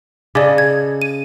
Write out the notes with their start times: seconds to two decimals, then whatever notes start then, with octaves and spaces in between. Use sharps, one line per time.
0.35 C#3 A4 D5 D#5 D6
0.58 G#6
1.02 D#7